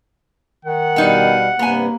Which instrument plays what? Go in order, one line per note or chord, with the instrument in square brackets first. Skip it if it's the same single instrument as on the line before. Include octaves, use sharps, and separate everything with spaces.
[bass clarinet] D#3 [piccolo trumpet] F#5
[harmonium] B2 G3 F5 [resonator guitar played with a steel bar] B3 D#4
[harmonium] G2 C3 [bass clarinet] A#3 [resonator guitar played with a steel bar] B3 G#5